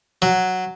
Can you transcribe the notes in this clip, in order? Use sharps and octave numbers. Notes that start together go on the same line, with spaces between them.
F#3